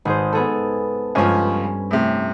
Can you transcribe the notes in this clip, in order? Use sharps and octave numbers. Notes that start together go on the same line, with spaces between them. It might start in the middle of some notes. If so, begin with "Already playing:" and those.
G#1 G#4 C5
B3 G#4 A4
C#2 G2 F3 C#4 G#5
A2 C3